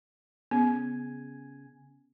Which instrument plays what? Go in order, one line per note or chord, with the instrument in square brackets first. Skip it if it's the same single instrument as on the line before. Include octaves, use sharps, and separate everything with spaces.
[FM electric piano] C#3 G#5 [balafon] B3